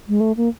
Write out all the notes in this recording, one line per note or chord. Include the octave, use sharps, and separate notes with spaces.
G#3
A3
A#3